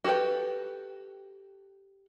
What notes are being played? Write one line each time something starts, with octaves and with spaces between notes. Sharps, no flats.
F#4 G4 A4 B4 G5